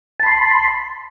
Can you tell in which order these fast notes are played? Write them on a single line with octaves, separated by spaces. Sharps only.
A5 B5 C6